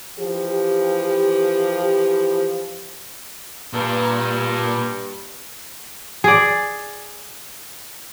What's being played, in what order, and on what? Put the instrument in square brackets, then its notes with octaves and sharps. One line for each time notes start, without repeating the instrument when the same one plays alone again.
[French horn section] E3 F3 G4
[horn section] G2 [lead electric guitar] A#2
[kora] G#4 D5